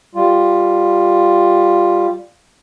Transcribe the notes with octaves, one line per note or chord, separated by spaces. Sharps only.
G3 F4